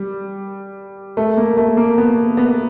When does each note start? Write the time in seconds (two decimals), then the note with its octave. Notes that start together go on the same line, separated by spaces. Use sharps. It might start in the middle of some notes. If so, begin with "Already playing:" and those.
Already playing: G3
1.17 A3
1.37 A#3
1.57 A3
1.77 A#3
1.98 B3
2.37 B3